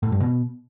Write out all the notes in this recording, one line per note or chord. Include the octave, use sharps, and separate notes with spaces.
A2
G2
B2